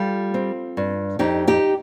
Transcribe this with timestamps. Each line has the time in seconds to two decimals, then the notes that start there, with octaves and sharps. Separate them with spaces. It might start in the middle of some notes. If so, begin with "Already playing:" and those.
Already playing: G3 F4 A4
0.34 C4
0.77 G2
1.19 F2 D#4 G4
1.47 D#4 G4